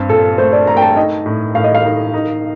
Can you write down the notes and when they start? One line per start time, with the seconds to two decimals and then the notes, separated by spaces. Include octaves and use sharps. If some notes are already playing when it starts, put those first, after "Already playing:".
Already playing: G2 C4
0.09 A#2 A4
0.38 A3 C5
0.53 D5
0.67 A3 A#5
0.77 G5
0.82 A5
0.96 D#4 D#5
1.26 A2
1.55 A2 F5
1.64 D#5
1.74 F5
1.85 D#4
2.14 D#4